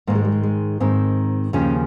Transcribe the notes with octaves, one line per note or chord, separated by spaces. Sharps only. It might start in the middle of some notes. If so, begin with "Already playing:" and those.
G#2 D#3 A#3
G#3
G3
G#3
G#3
G#2 D#3 C4
D#2 C#3 F3 C#4